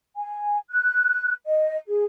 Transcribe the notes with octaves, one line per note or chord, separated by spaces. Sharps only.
G#5
F#6
D#5
G#4